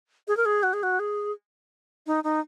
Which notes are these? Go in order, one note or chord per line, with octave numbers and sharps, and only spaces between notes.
G#4
A#4
G#4
F#4
G#4
F#4
G#4
D#4
D#4